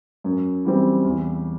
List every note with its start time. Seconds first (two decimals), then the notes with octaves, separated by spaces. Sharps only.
0.24 F#2
0.65 E3 G3 C4
1.05 E2